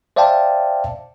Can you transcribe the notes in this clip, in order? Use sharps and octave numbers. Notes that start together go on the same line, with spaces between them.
C5 D5 E5 F5 G5 A5